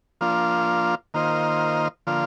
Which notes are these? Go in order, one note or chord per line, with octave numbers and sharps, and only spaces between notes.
F3 A#3 D4 F4
D#3 A#3 F4 C5 D#5
D3 F3 A#3 F4